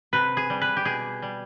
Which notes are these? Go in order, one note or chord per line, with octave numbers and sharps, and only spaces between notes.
C3 B4
G#4
G3
B4
G4
B2 G#4
G3